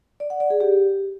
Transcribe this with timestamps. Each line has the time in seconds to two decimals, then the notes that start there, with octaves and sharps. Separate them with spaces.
0.20 D5
0.30 F#5
0.40 D5
0.50 G#4
0.60 G4